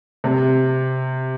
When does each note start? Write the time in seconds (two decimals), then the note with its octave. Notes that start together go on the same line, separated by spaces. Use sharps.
0.24 C3